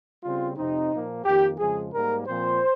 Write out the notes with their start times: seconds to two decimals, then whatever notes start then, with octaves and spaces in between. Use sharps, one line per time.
0.23 C#3 G3 C4 F4
0.57 F2 C3 F3 C4 D#4
0.91 A#2 F3 A#3
1.25 F2 D#3 A#3 G4
1.59 F2 C#3 F3 G#3 G#4
1.93 G#2 G3 A#3 A#4
2.27 A#2 F3 C4 C5